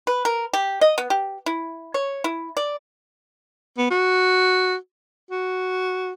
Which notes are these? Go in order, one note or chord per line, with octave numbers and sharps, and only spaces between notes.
B4
A#4
G4
D#5
B3
G4
E4
C#5
E4
D5
B3
F#4
F#4